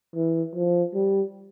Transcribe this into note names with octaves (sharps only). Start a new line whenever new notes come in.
E3
F3
G3